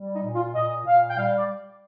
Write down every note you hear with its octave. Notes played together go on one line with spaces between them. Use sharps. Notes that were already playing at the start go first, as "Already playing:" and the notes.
Already playing: G3
D#4
A#2
F4
A#2 D#5
A#2 F5
G5
G3 F5
D5